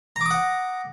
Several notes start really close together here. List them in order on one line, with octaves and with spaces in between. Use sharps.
A#5 D6 D#6 F#5